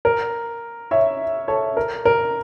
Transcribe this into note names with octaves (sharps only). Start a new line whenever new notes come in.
A#4
C#5 E5
A4 C#5
A#4
A#4